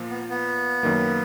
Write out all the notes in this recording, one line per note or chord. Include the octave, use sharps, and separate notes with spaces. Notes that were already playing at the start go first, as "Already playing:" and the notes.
Already playing: A#2 F3 A#3 F4
B3
B3
F#2 D#3 A#3